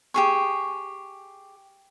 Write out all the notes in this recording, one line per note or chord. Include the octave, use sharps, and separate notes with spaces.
G4 G#4 C#6